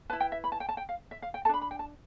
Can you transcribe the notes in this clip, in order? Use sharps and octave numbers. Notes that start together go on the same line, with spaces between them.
E4 B4 A5
G5
E5
B5
A5
G5
A5
G5
F5
E5
F5
G5
A4 A5
D4 B5
B5
G5
A5